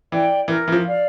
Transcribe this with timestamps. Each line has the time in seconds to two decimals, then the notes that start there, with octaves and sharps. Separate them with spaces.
0.12 E3 D5 G5
0.48 E3 A#4
0.68 E3
0.72 F3
0.85 D5 F5